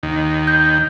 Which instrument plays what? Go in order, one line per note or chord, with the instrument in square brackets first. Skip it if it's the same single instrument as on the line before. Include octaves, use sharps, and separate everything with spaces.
[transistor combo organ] D#2
[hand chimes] G6